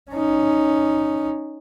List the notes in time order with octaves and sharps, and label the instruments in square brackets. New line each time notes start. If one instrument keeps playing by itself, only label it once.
[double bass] C#4 D#4